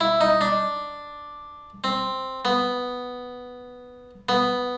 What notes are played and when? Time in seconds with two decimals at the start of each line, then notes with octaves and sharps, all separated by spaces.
0.01 E4
0.21 D#4
0.41 D4
1.84 C4
2.45 B3
4.29 B3